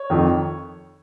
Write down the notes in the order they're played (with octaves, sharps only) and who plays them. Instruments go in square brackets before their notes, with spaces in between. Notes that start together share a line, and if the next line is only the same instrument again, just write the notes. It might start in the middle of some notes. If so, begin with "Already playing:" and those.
Already playing: [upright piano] C#5
F2 D#3